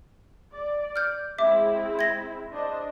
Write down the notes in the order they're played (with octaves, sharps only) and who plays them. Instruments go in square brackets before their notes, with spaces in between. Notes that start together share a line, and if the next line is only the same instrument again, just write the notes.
[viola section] D5
[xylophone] F6 G6
[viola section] G#3 C4 E4 [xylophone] E5 D6
[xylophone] G#6 A#6
[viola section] D4 C5 D#5